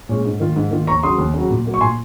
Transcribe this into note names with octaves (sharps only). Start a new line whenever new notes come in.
A#2 G#3 C#4
G#2
D#3 A#3 F4
G#2
D#3 A#3 F4
D#2 A#5 C#6
C#3 F#3 C6 D#6
D#2
C#3 F#3
A#2
F#3 A#3
C#6
A#2 G#5 C6